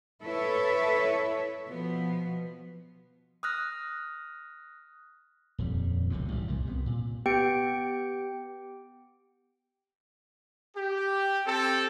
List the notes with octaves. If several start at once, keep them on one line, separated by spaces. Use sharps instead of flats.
E4 A4 B4 C#5 E5
B2 F3 B3
D#6 F6 F#6 A#6
D#1 F2 G3
E1 C#2 F#2 C3
A1 G3
C2 A#2
C2 C3 G3 B3
A#2
B3 G4 G5 C#7 D7
G4
C4 A4